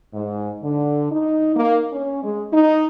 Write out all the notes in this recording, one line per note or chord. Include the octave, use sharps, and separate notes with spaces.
G#2
D3
D#4
A#3
C#4
G#3
D#4